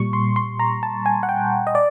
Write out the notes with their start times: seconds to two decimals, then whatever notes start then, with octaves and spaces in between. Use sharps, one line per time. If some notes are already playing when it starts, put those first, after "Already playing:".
Already playing: A#2 G3 C#6
0.13 C6
0.36 C6
0.60 A#5
0.83 A5
1.06 G#5
1.23 F#5
1.29 G5
1.67 D#5
1.75 D5